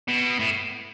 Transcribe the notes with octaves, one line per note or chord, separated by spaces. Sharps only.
B2
A2